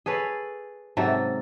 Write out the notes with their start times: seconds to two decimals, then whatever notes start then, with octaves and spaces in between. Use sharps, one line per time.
0.06 G#4 A4 B4 C#5
0.97 G#2 C3 F#3 A4